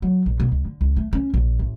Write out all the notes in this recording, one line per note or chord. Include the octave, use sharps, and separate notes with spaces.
F#3
A#1
B2
C#2
D3
C#2
A3
C#4
A#1
A1